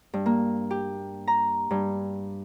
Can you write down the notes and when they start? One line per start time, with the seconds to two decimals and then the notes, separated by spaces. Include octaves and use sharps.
0.14 G2
0.26 A#3
0.71 G4
1.27 A#5
1.71 G2